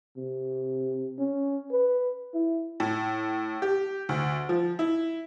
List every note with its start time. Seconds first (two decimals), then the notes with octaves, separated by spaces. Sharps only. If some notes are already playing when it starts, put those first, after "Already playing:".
0.17 C3
1.19 C#4
1.72 B4
2.34 E4
2.80 A2
3.62 G4
4.09 D2
4.49 F3
4.79 E4